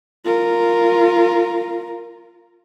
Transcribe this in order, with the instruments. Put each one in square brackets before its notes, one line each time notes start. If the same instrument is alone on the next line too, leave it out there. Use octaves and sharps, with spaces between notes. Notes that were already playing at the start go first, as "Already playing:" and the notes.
[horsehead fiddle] F4 A#4